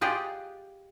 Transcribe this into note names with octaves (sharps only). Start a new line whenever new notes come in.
F4 G4 G#4 D5 D#5 F#5